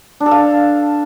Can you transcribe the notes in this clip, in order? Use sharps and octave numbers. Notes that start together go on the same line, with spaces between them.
D4
A4
F5